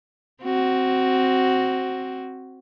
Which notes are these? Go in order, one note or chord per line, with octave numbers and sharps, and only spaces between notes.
C4 F#4